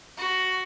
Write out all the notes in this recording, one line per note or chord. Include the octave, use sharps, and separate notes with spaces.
F#4